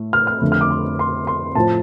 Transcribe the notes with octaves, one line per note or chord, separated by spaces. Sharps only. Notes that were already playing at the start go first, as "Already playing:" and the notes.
Already playing: A2 A3
F6
F6
F2 D3 A3
F6
D6
C6
C6
C6
A2 F3 C4 F4 A5